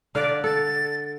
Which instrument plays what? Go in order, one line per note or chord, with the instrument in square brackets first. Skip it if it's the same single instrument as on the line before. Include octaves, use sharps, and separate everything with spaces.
[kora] D3 F5 [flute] D5
[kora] A4 [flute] A6